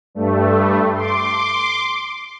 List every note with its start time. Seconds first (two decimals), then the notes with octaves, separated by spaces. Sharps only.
0.15 G2 A3
0.95 C6 D6